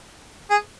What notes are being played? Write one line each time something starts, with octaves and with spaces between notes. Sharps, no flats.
G#4